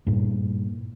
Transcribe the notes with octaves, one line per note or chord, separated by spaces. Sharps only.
G2 A#2